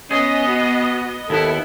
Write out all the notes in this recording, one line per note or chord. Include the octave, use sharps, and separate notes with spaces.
B3 C#4 G#4 D#5
F#4
D#2 B3 E4 A4